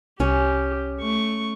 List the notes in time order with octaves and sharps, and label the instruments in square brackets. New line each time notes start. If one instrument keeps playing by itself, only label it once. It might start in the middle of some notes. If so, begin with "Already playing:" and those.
[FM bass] C2 [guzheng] C#4 [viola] G4
[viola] A3 C#6